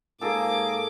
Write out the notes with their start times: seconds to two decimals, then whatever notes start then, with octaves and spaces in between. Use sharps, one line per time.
0.21 G#2 A#3 G#4 A4 D6